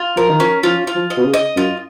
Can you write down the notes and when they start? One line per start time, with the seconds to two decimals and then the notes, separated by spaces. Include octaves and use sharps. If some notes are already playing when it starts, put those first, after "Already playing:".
Already playing: F4
0.16 F3 A#4
0.29 D#3
0.40 F3 C#4
0.63 F3 F4
0.87 F4
0.95 F3
1.10 D#5
1.17 B2
1.25 C#3
1.34 D#5
1.56 F#2 F4